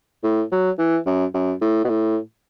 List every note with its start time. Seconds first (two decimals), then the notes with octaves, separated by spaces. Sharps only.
0.24 A2
0.52 F#3
0.79 E3
1.06 F#2
1.34 F#2
1.61 A2
1.84 B2
1.89 A2